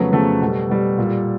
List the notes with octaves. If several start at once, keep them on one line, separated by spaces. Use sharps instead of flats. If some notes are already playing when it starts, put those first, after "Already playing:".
Already playing: F2 C#3 F#3 A3 B3 B4
F2 C#3 F#3 A3 A4
B2 G3
B2 G3
A#2 G3